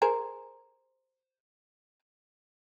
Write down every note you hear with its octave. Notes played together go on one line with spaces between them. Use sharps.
G#4 A#4 C5